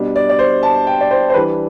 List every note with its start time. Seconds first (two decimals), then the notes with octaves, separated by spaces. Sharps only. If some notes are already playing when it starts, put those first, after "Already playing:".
Already playing: B2 G3 D4
0.16 D5
0.29 D5
0.39 C5
0.63 A5
0.87 G5
1.01 D5
1.11 C5
1.30 C5
1.34 E3 G3 D4 B4